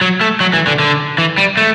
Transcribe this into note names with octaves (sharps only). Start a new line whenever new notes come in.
F#3
A3
F#3
E3
D3
D3
E3
G3
A3